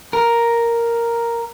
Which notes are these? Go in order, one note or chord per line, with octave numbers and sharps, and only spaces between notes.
A#4